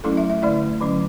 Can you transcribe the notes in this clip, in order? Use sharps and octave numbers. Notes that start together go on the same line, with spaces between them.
F#3 A3 C#4 E4 A4
E5
E5
D3 A3 E4 D5
D3 F#3 C#4